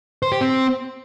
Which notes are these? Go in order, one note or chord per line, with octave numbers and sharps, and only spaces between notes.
C5
G4
C4